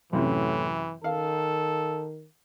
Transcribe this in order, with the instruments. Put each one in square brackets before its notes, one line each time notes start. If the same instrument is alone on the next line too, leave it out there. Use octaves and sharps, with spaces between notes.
[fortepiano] F#2 C3 E4 [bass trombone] A2 [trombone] E3
[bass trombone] D#3 [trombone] A4 [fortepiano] F5